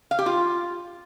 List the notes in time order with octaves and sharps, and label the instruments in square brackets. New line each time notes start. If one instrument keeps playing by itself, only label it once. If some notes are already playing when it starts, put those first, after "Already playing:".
[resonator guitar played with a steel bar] F5
G4
F4